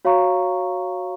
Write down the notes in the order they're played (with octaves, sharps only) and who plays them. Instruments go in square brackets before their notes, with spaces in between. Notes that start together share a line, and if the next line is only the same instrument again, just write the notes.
[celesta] F#4 C#5 F5 A#5 C#6